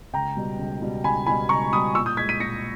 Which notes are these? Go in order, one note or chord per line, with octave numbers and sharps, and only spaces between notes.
C#2 G5 A#5
B2 G3
C#2
B2 G3
C#2 G#5 B5
B2 G3 G#5 B5
C#2 A#5 C#6
B2 G3 B5 D#6
A#2 C#6 E6
D#6 G6
G#3 G#6 B6
B6 D#7
A#2 A#6 C#7